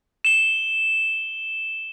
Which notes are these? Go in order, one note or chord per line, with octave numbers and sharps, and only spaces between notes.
E7 G7